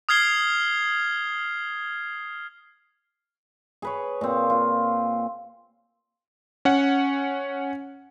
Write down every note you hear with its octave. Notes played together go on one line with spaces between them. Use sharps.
D#6 F6 G#6 C7 G7
G#4 B4 C#5
A#2 C4
F4
C#4 F#5